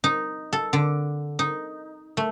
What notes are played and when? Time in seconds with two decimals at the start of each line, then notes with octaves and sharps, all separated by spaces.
0.04 D#4
0.53 A4
0.73 D3
1.39 D#4
2.17 A3